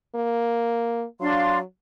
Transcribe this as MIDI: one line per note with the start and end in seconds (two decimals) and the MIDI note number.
0.15 1.05 58
1.21 1.63 54
1.21 1.58 62
1.21 1.58 77
1.21 1.58 84